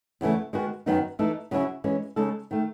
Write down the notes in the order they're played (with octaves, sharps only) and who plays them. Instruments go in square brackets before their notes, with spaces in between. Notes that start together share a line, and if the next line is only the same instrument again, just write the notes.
[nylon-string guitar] E2 C#3 E3 A3
D#3 G#3 B3 F#4
F#2 D#3 F#3 B3 D#4
E3 A3 D#4 A4
C#3 F#3 C#4 E4
E3 G#3 C#4
C#3 G#3 D#4 A4
D#3 A3